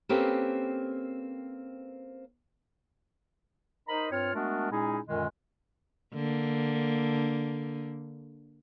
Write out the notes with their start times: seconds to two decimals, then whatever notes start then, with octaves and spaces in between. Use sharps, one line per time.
0.09 A#3 C4 C#4 G4 A4 B4
3.88 D#4 A#4 C5 D#5 A#5 B5
4.12 G2 C4 F4 C#5 F6
4.34 G#3 A3 B3 D4 F#4 A#4
4.70 A#2 G#3 C#4 D#4 E4 G#4
5.08 F#2 A#2 D3 D#3 G#3
6.14 D3 A#3